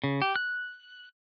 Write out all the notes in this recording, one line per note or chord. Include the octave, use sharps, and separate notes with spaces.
C#3
G4
F#6